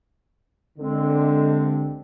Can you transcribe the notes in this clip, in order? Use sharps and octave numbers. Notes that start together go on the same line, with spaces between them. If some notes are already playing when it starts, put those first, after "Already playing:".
C2 D3 G#3 C4